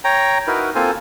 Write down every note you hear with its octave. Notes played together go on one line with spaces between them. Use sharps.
C#5 G5 A#5
D#4 E4 F#4 A#4 B4
A#3 C4 F4 A4 C5 G#5